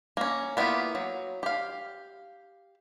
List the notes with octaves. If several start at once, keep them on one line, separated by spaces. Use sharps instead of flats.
A#3 C#4
A#3 B3 E4 F4 G4
F#3
G4 F5